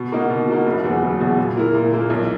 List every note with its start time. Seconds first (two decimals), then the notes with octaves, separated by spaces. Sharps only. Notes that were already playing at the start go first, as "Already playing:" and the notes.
Already playing: B2
0.12 A#3 D#4 F#4
0.30 B2
0.48 A#3 D#4 F#4
0.66 F#1
0.84 E2 B2 F#3 B3
1.02 F#1
1.20 E2 B2 F#3 B3
1.38 A#2
1.56 A#3 E4 A#4
1.74 A#2
1.92 A#3 E4 A#4
2.10 B1